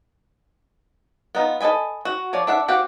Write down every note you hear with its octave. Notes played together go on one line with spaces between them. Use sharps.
B3 D#4 F4
A4 B4 D#5 G#5 B5
F#4
F3 C#5 D5
D4 E5 F#5
C4 F#4 G4 F5 F#5